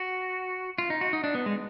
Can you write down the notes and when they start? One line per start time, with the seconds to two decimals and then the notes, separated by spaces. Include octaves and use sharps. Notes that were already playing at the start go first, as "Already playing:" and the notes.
Already playing: F#4
0.78 F4
0.90 D#4
1.01 F#4
1.13 D#4
1.24 D4
1.35 B3
1.46 G#3